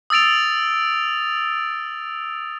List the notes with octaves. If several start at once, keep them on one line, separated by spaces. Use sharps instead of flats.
D#6 E6 A6 D7 F7